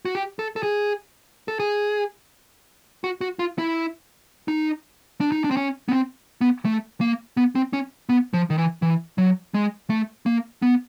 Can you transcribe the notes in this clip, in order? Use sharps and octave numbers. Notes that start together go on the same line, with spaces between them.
F#4
G4
A4
A4
G#4
A4
G#4
F#4
F#4
F4
E4
D#4
D4
D#4
D4
C4
C#4
B3
C4
B3
A3
A#3
B3
C4
C#4
B3
F3
D#3
E3
E3
F#3
G#3
A3
A#3
B3